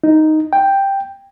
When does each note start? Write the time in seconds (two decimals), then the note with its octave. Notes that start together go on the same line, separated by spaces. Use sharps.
0.04 D#4
0.53 G5